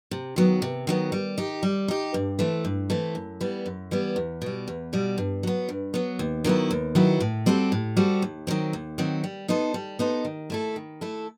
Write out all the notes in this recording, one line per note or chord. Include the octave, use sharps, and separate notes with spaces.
C3
D#3 F#3 B3
C3
D#3 F#3 B3
G3
D#4 G4
G3
D#4 G4
G2
E3 A3 C4
G2
E3 A3 C4
F#2
E3 G3 B3
F#2
E3 G3 B3
E2
B2 G3
E2
B2 G3
G2
F#3 B3
G2
F#3 B3
D#2
D#3 F#3 B3 E4
D#2
D#3 F#3 B3 E4
A2
G3 C4 F#4 A4
A2
G3 C4 F#4 A4
D#2
D#3 F#3 C4
D#2
D#3 F#3 C4
G3
B3 D#4 A4 C5
G3
B3 D#4 A4 C5
D#3
A3 E4 A4
D#3
A3 E4 A4